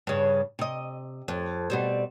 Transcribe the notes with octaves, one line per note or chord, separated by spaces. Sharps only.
G2 C#3
C3 D#5
F2
B2 G3 C4